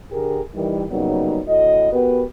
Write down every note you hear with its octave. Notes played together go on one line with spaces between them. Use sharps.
D3 G4 G#4 A#4
D#3 E3 G3
C#3 F#3 G3 A#3 B3 D#4
D2 A2 F#4 D#5
B3 F#4 G4 A#4 B4